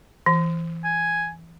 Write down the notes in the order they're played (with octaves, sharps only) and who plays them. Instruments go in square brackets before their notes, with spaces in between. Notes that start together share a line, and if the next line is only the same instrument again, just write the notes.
[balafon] E3
[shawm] G#5